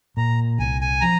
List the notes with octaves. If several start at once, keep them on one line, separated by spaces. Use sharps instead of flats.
A#2 A#5
C2 G#5
G#5
F3 A#5